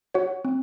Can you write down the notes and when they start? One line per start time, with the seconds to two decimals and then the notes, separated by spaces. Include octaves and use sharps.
0.14 F#4 C#5 F#5
0.45 C4